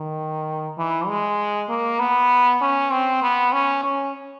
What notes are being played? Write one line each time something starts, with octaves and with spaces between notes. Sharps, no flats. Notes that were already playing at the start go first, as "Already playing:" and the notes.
Already playing: D#3
E3
G#3
A#3
B3
C#4
C4
B3
C#4
C#4